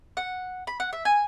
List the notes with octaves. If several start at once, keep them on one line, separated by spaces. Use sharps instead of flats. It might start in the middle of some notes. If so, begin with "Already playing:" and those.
F#5
B5
F#5
E5
G#5